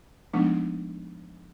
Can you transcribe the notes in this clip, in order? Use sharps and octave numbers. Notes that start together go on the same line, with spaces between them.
F3 G#3 A3 B3 D4 D#4